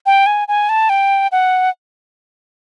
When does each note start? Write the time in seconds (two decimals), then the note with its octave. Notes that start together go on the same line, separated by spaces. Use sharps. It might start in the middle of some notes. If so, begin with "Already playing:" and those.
0.06 G5
0.26 G#5
0.48 G#5
0.69 A5
0.89 G5
1.32 F#5